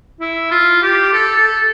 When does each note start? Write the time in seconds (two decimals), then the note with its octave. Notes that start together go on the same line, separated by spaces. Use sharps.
0.20 E4
0.51 F4
0.82 G4
1.13 A4
1.37 A4